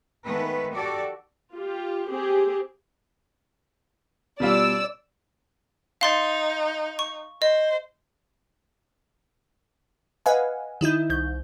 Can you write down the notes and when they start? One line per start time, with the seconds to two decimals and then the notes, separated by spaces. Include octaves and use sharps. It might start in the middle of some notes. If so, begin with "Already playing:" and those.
0.25 D#3 G#3 A3 B3 B4
0.74 F#4 G4 A4 D5
1.54 F4 G4
2.09 C4 G4 G#4
4.40 B2 G3 F4 D5 E6
6.01 D#4 F5 C6 A6
6.99 C#6
7.42 C5 D#5
10.26 B4 D#5 F5 F#5 G#5
10.81 D#3 D#4 E4 G6
11.10 C2 G6